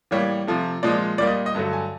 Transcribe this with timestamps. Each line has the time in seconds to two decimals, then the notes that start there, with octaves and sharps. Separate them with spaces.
0.11 A2 E3 G3 A#3 C#5
0.48 C3 F3 A3
0.83 A#2 F3 G#3 D5
1.18 A#2 G3 A#3 D5
1.27 D#5
1.46 D#5
1.55 G2 D3 F#3 A3
1.73 G#5